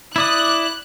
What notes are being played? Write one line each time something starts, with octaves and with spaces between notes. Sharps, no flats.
E4 D5 D#6 F#6